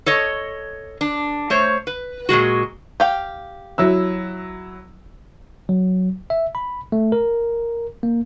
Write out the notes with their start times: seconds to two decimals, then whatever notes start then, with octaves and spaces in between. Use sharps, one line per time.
0.06 A4 C#5 D#5
1.01 D4
1.50 A3 C5 C#5
1.87 B4
2.29 A#2 F3 G#3 F#4
3.00 G4 F5 G5
3.78 F#3 E4 E6
5.69 F#3
6.30 E5
6.55 B5
6.92 A3
7.12 A#4
8.03 A#3